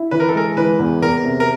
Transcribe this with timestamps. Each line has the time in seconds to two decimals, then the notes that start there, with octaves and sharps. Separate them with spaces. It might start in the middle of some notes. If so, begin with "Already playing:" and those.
Already playing: E4
0.11 E3 B4
0.20 A#4
0.29 A4
0.35 G#3 A#4
0.57 E3 B4
0.79 E2
1.02 E2 A#4
1.25 C3
1.40 A#4